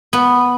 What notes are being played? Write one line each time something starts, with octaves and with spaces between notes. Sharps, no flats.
B3